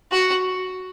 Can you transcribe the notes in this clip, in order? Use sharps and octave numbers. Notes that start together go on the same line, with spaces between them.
F#4